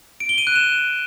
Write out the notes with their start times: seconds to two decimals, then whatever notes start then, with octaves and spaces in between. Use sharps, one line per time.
0.20 D7
0.29 G7
0.38 D#7
0.47 F#6
0.56 E7